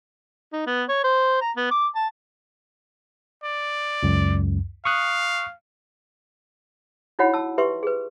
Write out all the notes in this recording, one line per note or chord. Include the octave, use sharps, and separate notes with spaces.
D#4
B3
C#5
C5
A#5
B3
D6
A5
D5
C#2 F#2
F5 C#6 D#6 F#6
D#4 E4 F#4 C#5 F#5 B5
A5 E6
G4 B4 E5 C6 C#6
G#4 B4